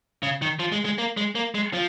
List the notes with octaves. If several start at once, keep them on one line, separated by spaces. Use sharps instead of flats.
C#3
D#3
F3
G#3
G#3
A#3
G#3
A#3
G#3
F3